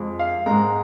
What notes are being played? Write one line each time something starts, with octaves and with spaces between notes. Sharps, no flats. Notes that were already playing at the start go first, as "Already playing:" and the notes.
Already playing: F2 F3 G#3
F5
G#2 G#3 A#5